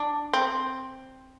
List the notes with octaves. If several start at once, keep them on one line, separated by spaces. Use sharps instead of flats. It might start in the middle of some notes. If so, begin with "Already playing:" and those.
Already playing: D4
C4